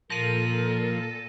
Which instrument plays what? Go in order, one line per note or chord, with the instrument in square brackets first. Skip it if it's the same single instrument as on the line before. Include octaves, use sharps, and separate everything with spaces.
[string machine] A#2 A4 [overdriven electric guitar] F3 [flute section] A#4 [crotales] A#6 D#7